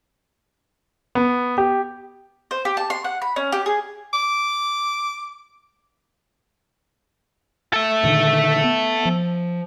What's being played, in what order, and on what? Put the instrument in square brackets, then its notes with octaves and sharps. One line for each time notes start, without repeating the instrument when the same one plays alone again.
[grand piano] B3
G4
[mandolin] C5
G4
A5
C6
F#5
B5
C#4
G4
G#4
[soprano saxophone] D6
[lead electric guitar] A4 E5
[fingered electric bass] A#2 D3 D#3
B3
F3